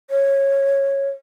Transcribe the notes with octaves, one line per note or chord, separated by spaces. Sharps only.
C#5